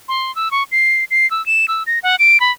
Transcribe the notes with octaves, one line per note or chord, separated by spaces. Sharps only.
C6
E6
C#6
C7
C7
E6
E7
E6
A#6
F#5
D7
B5